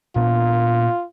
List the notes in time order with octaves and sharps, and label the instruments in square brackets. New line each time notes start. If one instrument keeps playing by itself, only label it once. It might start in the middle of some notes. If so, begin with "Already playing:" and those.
[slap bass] A#2 B3 D4 [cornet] F4